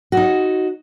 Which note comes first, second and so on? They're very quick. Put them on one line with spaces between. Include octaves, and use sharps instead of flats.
F#4 D#4 C#5